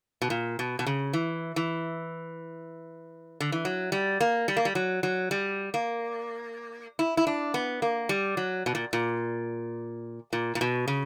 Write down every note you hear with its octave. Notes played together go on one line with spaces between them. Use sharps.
B2
A#2
B2
B2
C#3
E3
E3
D3
E3
F#3
G3
A#3
G3
A#3
G3
F#3
F#3
G3
A#3
E4
E4
D4
B3
A#3
G3
F#3
B2
A#2
A#2
A#2
A#2
B2
C#3